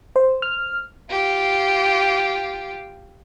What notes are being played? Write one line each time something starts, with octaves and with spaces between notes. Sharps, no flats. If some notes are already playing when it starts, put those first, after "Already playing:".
C5
F6
F4 G4